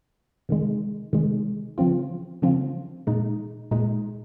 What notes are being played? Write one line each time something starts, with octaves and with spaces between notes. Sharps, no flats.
C3 D#3 G#3
C3 D#3 G#3
C#3 F3 C4 F4
C#3 F3 C4 F4
A#2 G#3 D#4
A#2 G#3 D#4